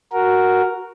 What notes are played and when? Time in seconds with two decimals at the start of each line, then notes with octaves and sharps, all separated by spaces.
0.13 F#4 A#4